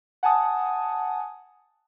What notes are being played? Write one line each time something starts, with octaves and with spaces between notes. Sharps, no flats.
F#5 G#5 A5 D#6